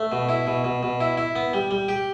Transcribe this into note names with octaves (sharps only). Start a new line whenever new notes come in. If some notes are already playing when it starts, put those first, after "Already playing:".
Already playing: A3
B2
E4
B2
B2
B2
E4
E4
B3
G3
G3
G4